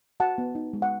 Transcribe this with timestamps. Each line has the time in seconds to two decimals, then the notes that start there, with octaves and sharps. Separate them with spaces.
0.20 F#4 F#5 A5
0.38 B3
0.55 D#4
0.73 G#3
0.82 F#5